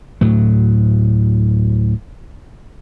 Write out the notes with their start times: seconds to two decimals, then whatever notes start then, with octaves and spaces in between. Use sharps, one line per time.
0.21 D2 A2 F#3